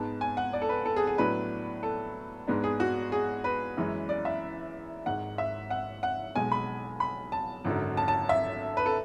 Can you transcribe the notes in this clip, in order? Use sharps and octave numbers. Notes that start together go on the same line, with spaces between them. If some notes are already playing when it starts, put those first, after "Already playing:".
Already playing: G#2 G#3 B3 A5
G#5
F#5
D5
A4
B4
A4
G#4
G#4
A2 F#3 B3 D4 B4
A4
G#2 G#3 B3 D4
G#4
F#4
G#4
B4
F#2 E3 G#3 C#4
D5
E5
G#1 G#2 G#3 F#5
E5
F#5
F#5
B1 B2 G#3 G#5
B5
B5
A5
G#1 F#2 D3 F#3
A5
A5
E5
B4
A4